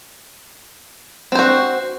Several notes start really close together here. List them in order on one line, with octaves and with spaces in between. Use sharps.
C4 C5 F#4